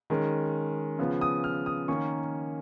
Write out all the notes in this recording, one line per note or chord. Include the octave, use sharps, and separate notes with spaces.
D#3 G#3 C#4
C#3 F3 B3
D#6
F6
D#6
D#3 A#3 C#4 C#6